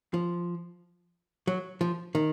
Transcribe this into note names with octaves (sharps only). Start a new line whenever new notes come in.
F3
F#3
F3
D#3